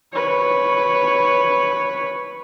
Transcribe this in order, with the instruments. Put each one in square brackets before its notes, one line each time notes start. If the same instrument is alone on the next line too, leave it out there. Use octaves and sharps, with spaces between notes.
[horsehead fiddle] B4 C#5